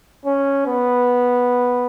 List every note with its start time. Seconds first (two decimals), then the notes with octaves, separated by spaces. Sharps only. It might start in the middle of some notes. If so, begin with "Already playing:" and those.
0.25 C#4
0.67 B3